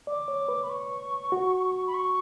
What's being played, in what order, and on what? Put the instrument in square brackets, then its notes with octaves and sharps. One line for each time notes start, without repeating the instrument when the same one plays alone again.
[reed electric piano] D5 [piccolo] D6
[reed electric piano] C#5
B4
[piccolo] B5
C#6
[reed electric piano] F#4
[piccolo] B5
C#6